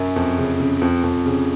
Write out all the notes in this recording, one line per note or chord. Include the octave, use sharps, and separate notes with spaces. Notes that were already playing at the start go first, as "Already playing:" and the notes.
Already playing: F#2
F2
C#3
C#3
F2
F2
C#3